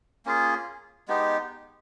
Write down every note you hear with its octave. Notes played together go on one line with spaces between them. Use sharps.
A#3 C#4 F4 G#4
G#3 B3 D#4 G4